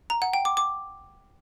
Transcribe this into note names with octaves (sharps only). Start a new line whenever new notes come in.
A#5
F#5
G5
D6
D6